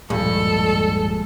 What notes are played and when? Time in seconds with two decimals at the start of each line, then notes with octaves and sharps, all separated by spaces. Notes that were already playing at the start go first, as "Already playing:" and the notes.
0.10 D1 G2 A#2 F3 G#3 A4